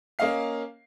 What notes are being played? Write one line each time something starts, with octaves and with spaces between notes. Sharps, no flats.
A#3 C#4 D#5 F5 C7